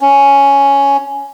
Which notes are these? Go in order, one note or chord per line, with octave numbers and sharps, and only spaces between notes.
C#4